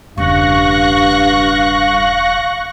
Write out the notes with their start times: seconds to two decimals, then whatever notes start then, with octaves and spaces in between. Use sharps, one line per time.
0.17 E1 G2 C#3 F5 C#6 F#6 A#6